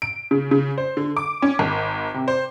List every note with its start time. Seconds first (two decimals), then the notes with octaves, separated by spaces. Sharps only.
0.02 D7
0.31 C#3
0.51 C#3
0.78 C5
0.97 D3
1.17 D6
1.42 C#4
1.59 G#1
2.14 C3
2.28 C5